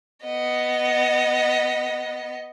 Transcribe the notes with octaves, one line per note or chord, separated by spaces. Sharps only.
B3 D#5